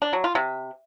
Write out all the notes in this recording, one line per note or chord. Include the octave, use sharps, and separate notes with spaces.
D4
F#3
F4
C3